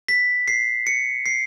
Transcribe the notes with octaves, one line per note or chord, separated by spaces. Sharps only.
B6
C7
C#7
C7